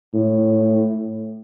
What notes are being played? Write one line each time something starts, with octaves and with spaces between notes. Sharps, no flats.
A2